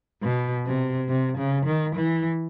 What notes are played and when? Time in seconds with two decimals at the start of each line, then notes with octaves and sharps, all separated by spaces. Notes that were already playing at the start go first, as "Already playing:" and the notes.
0.22 B2
0.65 C3
1.09 C3
1.38 C#3
1.66 D#3
1.95 E3